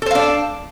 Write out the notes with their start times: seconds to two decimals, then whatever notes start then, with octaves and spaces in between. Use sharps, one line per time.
0.02 A4
0.06 C5
0.11 F5
0.15 D4